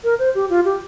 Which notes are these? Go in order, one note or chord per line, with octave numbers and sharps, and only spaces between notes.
A#4
C5
G4
F4
G4